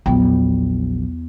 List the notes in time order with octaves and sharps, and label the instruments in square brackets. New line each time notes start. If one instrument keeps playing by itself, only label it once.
[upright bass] A#1 F#3 [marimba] E2 B3 G5